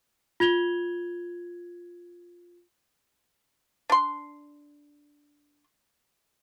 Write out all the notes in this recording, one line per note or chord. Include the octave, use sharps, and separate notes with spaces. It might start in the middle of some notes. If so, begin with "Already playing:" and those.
F4 G#6 F7 G7
D4 C6